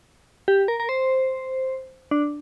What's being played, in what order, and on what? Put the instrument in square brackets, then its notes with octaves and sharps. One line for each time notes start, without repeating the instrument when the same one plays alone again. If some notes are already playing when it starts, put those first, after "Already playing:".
[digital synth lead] G4
A#4
A#4
C5
D4